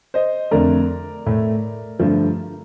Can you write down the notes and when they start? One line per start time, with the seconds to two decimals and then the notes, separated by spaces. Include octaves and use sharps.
0.14 C5 D#5
0.51 F2 D3 A3 A#4 D5
1.26 A2 A3
1.99 G2 D3 F3 A3